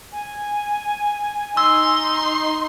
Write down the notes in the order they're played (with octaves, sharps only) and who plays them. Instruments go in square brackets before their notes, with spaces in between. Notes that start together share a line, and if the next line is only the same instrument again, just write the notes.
[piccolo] G#5
[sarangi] D#4 [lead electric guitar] C6 [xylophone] E6